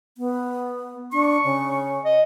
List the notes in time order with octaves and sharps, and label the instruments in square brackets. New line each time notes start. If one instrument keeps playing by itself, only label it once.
[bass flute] B3
[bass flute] D4 [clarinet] C#6
[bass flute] C#3
[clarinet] D#5